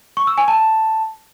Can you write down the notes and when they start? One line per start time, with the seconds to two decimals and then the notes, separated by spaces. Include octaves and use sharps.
0.17 C#6
0.27 E6
0.38 G#5
0.48 A5